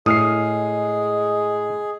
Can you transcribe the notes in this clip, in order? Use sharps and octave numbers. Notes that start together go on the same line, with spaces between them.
A2 G#3 G#4 D#6 F6 C7